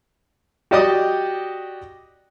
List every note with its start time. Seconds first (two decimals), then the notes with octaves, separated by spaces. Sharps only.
0.71 F#4 G4 D5 D#5 G5 D#6